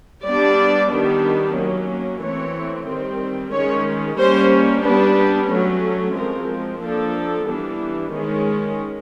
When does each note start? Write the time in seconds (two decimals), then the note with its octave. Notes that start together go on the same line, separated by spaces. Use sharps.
0.24 G3 B3 D4 D5
0.90 D#3 G3 B3 D4
1.55 F#3 A#3 C#4
2.22 E3 A3 C4 C#5
2.87 D#3 G3 C4
3.53 D#3 G#3 C#4 C#5
4.18 G3 A#3 C#4 C5
4.84 G3 B3 D4 B4
5.50 F#3 A3 C#4
6.15 F3 G#3 C4 A#4
6.82 F3 A#3 D4 A4
7.47 E3 G3 B3 D4
8.12 D#3 G#3 C#4